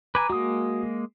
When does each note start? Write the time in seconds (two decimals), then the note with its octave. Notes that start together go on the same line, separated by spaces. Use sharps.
0.15 B4 G#5 A#5 D6
0.30 G#3 A#3 F#4 D#6